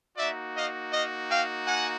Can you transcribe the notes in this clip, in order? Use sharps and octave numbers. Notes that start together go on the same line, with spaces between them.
A#3 D#4 F#4 D5 E5
D#5 F5
D#5 F5
F5 G5
F#5 G#5